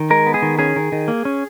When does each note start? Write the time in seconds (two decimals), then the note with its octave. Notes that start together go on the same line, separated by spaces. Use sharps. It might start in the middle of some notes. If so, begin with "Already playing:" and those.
Already playing: D#3
0.10 G#3 A#4
0.26 B3
0.34 G#4
0.42 D#3
0.59 C#4 G#4
0.76 D#3
0.92 D#3
1.08 A#3
1.25 C#4